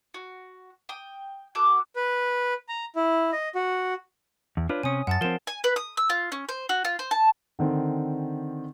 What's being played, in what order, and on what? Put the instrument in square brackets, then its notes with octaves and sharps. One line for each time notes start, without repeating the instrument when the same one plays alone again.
[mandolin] F#4
G5 D#6
F#4 A4 D6 F#6
[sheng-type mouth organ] B4
A#5
E4
D#5
F#4
[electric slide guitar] E2
[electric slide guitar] D4 F4 B4 [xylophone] C#5
[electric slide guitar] C3 C#4 [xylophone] G#5 D#6
[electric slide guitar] F#2 [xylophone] F#5 A5 A6
[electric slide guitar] F3 C4 [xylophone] A#4 E7
[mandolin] G#5
B4
D#6
E6
F4
C#4
C5
F#4
F4
C5
A5
[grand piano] D3 D#3 C4